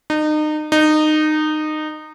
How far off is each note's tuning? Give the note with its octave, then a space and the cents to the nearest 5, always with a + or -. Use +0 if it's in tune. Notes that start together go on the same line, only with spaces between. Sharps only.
D#4 -30
D#4 -20